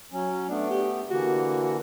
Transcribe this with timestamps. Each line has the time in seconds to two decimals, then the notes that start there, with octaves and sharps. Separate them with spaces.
0.12 F#3 C#4
0.49 A3 B3 D4
0.71 G4
1.10 D3 E3 A#3 F#4
1.62 F#4